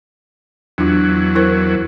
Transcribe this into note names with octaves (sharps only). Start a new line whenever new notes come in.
E2 F#3 D4 F4
E4 A#4 C5